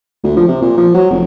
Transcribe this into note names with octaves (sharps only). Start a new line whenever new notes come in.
D2
F3
C3
A#2
F3
F#3
F1